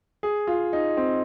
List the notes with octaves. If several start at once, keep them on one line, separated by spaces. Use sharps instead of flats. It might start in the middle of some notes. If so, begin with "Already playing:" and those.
G#4
F4
D#4
C4